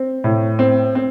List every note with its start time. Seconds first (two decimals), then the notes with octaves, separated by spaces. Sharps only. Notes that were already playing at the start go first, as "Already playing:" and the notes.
Already playing: C4
0.24 A2
0.59 C4
0.95 C4